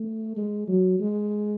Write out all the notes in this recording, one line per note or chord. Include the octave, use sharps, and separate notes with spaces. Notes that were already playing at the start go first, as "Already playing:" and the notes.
Already playing: A3
G#3
F#3
G#3